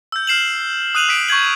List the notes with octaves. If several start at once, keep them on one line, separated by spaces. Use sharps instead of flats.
E6 G6
F6 C7 E7 F#7
D#6 F#6 D#7 F7 F#7
D#6 B6 D7
C#6 G6 G#6 F#7